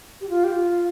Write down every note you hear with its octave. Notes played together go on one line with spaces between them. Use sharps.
G4
F4
G4
F4